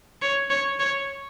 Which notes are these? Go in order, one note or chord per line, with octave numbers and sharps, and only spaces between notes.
C#5
C#5
C#5